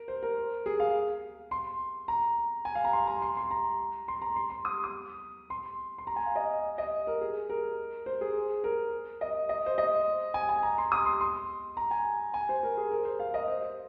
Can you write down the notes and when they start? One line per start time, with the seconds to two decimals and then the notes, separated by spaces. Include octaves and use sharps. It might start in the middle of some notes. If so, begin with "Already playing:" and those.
Already playing: A#4
0.08 C5
0.23 A#4
0.66 G#4
0.80 F5
1.51 C6
2.08 A#5
2.65 G#5
2.75 F5
2.85 A#5
2.93 C6
3.07 A#5
3.22 C6
3.37 C6
3.51 A#5
4.08 C6
4.22 A#5
4.36 C6
4.50 C6
4.65 D#6
4.84 D#6
5.50 C6
5.98 C6
6.07 A#5
6.16 G#5
6.26 F5
6.35 D#5
6.78 D#5
7.07 A#4
7.21 G#4
7.50 A#4
8.06 C5
8.21 G#4
8.64 A#4
9.21 D#5
9.49 D#5
9.66 C5
9.78 D#5
10.34 G#5
10.49 G#5
10.63 A#5
10.78 C6
10.92 D#6
11.06 C6
11.21 C6
11.77 A#5
11.91 G#5
12.34 G#5
12.49 C5
12.63 A#4
12.77 G#4
12.91 A#4
13.05 C5
13.20 F5
13.34 D#5
13.48 C5
13.62 C5